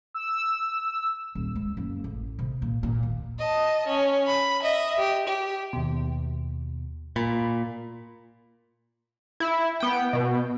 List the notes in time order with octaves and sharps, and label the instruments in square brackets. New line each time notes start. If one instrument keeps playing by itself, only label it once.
[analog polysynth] E6
[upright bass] D#1
G#3
F#1
A1
C3
A#2
A#2
D#2
[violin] D#5 A5
C#4
B5
D#5 E5
G4
G4
[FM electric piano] D#2 B2
[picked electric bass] A#2 [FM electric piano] B5
[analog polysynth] E4
B3 G5
B2